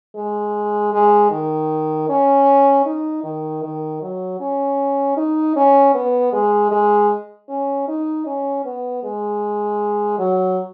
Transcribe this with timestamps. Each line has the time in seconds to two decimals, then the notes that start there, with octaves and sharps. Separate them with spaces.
0.16 G#3
0.93 G#3
1.31 D#3
2.09 C#4
2.86 D#4
3.24 D#3
3.63 D#3
4.02 F#3
4.40 C#4
5.17 D#4
5.56 C#4
5.94 B3
6.33 G#3
6.71 G#3
7.49 C#4
7.88 D#4
8.26 C#4
8.65 B3
9.04 G#3
10.19 F#3